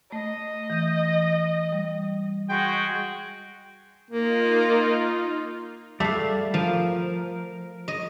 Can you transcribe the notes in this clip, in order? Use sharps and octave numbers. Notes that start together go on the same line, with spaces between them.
A3 D#5
E3 G6
G3
G#3 F#4 G5
A#3 D#4 F4
G3 A3 D5 E5 F5
F3 A#4
D#5